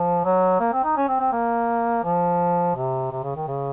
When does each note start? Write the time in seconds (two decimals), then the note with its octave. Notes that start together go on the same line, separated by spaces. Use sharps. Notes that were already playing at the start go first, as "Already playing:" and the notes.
Already playing: F3
0.24 F#3
0.60 A#3
0.73 C4
0.84 D#4
0.97 C#4
1.08 C4
1.20 C4
1.32 A#3
2.04 F3
2.75 C3
3.11 C3
3.23 C#3
3.36 D#3
3.48 C#3